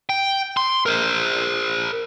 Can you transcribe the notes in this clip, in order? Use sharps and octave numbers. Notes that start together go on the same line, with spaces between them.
G5
C6
A#4 C5